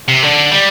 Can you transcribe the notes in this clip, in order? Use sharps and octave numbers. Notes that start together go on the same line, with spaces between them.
C3
D3
G3